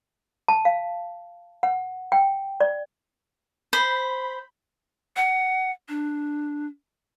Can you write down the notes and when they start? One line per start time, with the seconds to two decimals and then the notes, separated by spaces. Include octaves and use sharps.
0.48 A5
0.65 F5
1.63 F#5
2.12 G5
2.60 D5
3.73 C5 B5
5.17 F#5
5.89 D4